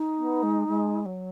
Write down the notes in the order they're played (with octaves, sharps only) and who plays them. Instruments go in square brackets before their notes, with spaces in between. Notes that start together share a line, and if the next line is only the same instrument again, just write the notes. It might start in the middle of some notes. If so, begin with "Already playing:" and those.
Already playing: [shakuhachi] D#4
[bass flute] B3
G#3
G#3
F#3